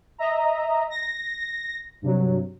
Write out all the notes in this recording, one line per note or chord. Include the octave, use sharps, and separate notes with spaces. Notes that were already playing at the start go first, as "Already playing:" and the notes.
D#5 E5 A#5
A#6
G2 C3 F#3